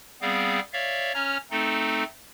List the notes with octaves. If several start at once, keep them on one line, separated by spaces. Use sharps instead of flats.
G3 B3 C4 G#4 F5
C#5 D5 E5 F5
C#4 C#5 A#5 F6
A3 C4 D#4 A4